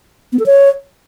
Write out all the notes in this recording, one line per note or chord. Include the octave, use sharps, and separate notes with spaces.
B3
A4
C#5